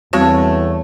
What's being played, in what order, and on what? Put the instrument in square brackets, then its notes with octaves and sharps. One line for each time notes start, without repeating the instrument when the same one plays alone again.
[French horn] E2 [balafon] G3 C4 F#4 [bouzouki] A3 C#5